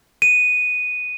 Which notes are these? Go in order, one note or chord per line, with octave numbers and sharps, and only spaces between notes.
D#7